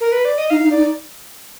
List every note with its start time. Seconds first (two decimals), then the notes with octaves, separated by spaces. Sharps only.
0.01 A#4
0.12 B4
0.25 D5
0.38 D#5
0.50 D#4 F5
0.63 D#4
0.71 D5
0.77 D#4